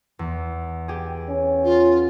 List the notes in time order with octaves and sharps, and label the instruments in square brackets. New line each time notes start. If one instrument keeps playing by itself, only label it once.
[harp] E2
G4 G#4
[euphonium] C#4
[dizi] F4